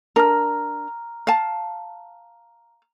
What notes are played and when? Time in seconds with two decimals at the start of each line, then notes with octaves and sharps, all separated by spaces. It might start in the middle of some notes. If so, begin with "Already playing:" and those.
0.16 D4 A#4 A#5 F6
1.27 F5 A5